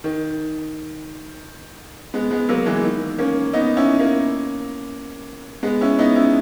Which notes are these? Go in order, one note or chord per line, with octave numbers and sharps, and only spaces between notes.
D#3
G#3 B3
G#3 B3
F#3 A#3
E3 G#3
D#3
A#3 C#4
B3 D#4
C#4 E4
A#3 C#4
G#3 B3
C#4 E4
B3 D#4
C#4 E4